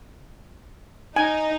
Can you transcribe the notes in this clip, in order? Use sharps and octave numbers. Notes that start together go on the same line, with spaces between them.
D#4 G#5